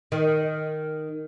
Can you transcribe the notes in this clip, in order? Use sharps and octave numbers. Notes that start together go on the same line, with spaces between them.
D#3